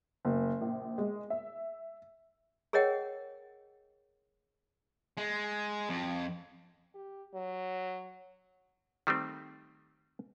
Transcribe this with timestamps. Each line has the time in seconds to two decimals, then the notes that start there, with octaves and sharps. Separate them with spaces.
0.25 F#1
0.61 A#1
0.98 G#3
1.30 E5
2.73 G#4 A#4 C#5 D#5 F#5 G5
5.17 G#3
5.89 F2
6.95 G4
7.34 F#3
9.07 D#3 G3 A3 C4